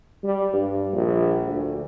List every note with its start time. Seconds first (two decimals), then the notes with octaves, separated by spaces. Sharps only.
0.23 G3
0.54 G2
0.93 A#1
1.47 D2